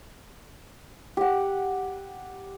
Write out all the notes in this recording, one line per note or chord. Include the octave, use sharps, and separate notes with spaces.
G4 F#5